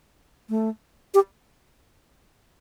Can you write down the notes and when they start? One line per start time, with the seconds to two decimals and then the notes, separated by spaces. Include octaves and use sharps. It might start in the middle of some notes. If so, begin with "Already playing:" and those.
0.49 A3
1.14 G4